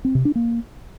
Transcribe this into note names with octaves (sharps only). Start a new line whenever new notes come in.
C4
C3
D4
A#3